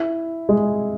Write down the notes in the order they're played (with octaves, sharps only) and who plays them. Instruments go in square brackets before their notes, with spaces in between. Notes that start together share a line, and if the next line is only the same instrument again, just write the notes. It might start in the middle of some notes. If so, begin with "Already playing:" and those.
Already playing: [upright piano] E4
G#3